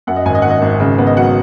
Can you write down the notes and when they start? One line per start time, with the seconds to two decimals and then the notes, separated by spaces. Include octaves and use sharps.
0.07 F#2 F#5
0.16 D#5
0.25 G#1 G#5
0.35 D#5
0.42 D#3 F#5
0.50 D#5
0.62 G#1
0.80 C#3
0.98 B3
1.07 D#5
1.17 F#3 F#5